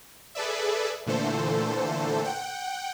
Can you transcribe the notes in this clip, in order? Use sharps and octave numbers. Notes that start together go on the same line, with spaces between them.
G#4 A4 B4 D5 E5
A#2 D3 E3 A3 A4 C5
F#5 G5